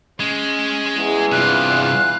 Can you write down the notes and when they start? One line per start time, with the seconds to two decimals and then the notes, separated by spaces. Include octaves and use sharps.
0.20 G#3 C#4
0.95 E2
1.32 G2 C3 F4 F5 F#6